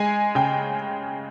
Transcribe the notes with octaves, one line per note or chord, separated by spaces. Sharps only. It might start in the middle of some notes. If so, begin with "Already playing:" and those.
Already playing: G#3 G#5
C#3 G5